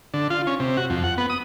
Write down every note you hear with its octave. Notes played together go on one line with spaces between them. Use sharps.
D3
F4
C#4
C3
F#4
F2
F#5
B3
D#6